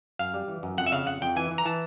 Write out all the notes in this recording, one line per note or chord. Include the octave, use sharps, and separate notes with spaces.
F#2 F5
G3
E3
F#2
F2 F#5
E5
C#3 F5
F2 F#5
F2 G5
E3 G#5
E3
A#5
E3 A5